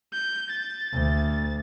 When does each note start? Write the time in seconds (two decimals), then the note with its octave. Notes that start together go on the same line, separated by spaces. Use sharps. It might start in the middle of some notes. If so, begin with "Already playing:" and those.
0.13 G6
0.50 A6
0.92 D2